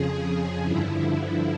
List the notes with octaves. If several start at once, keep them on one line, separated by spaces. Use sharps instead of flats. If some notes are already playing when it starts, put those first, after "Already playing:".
Already playing: F2 C#3 F3 G#4
G2 D3 F3 E4